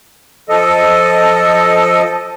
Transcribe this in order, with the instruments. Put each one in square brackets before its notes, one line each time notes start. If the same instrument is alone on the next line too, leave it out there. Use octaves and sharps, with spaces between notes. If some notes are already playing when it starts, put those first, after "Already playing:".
[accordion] F3 A4 D#5